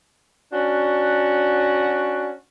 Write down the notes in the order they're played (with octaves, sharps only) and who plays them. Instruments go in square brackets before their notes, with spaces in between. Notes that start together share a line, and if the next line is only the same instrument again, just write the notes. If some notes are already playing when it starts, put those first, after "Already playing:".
[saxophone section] C#4 D4 F#4